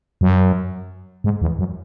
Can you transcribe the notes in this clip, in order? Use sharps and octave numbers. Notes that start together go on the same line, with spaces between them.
F#2
G#2
E2
F#2